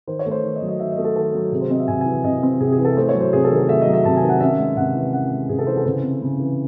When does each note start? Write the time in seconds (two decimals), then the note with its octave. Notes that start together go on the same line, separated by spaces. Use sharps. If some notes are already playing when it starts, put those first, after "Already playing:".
0.07 D#3 C5
0.19 C#5
0.26 A3
0.31 C5
0.44 D#3
0.56 D#5
0.63 F#3
0.68 D#5
0.80 D#3 E5
0.92 D#5
0.98 A3
1.04 A4
1.16 D#3 A4
1.35 F#3
1.52 C3 G#4
1.61 C5
1.70 C4 D#5
1.79 E5
1.88 C3 G#5
2.01 E3 G#5
2.24 C3 D#5
2.43 C4
2.60 C3 G#4
2.72 G#4
2.78 E3
2.85 A4
2.97 A3 C5
3.09 C#5
3.15 F#3
3.20 C5
3.33 C3 G#4
3.44 A4
3.51 D#3
3.57 A4
3.69 A3 E5
3.81 D#5
3.87 F#3
3.93 E5
4.05 C3 A5
4.17 G#5
4.23 D#3
4.29 F#5
4.40 C#4 E5
4.59 G#3
4.77 C3 F#5
4.95 E3
5.13 C#4 F#5
5.31 G#3
5.49 C3 G#4
5.59 A4
5.67 E3 C5
5.77 A4
5.86 C#3 C5
6.03 C4
6.22 C#3
6.40 E3